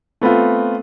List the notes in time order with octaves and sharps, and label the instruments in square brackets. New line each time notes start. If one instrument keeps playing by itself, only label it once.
[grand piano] A3 B3 C4 F4